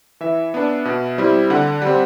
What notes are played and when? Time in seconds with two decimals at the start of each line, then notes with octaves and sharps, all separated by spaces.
0.21 E3 E5
0.54 B3 D4
0.85 B2
1.18 G3 C4 E4
1.50 D3 F#5
1.82 G3 C4